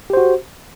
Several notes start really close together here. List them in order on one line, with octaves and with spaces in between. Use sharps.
G4 C5 F#4